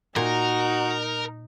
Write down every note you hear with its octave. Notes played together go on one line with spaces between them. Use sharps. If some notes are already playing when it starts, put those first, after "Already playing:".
A#2 D#4 F#4 A#4